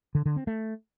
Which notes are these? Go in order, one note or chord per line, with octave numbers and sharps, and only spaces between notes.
D3
D3
C4
A3